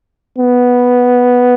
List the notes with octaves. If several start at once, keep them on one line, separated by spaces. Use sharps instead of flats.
B3